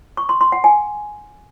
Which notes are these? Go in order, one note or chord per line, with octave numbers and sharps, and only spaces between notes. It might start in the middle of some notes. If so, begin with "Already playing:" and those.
C#6
C6
C6
F#5
G#5